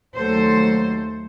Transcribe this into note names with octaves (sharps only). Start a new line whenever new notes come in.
D#2 F#3 A3 A4 C5